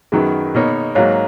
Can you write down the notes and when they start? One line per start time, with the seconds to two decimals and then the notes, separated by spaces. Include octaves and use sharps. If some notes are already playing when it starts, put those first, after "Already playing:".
0.12 F#2 D#3 F#3 B3 G#4
0.55 B2 A#3 D#4 A#4 C#5
0.95 G#2 F#3 A#3 C#5 F5